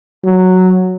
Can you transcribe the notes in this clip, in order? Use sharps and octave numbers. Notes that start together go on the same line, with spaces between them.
F#3